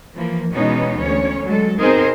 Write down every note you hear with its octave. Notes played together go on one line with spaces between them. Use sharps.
E3 F3 A#3
B2 E3 G#3 B3 C#4 D#4
D2 C#4 C#5
F#3 G#3 A4
B2 C4 D#4 G#4 A#4 C5